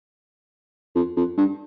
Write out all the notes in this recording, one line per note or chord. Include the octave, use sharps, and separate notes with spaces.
F2
F2
G2